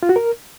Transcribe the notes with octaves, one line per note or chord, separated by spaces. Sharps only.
F4
F#4
A#4